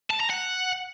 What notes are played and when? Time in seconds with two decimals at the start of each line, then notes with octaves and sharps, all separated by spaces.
0.11 A5
0.20 A#5
0.30 F#5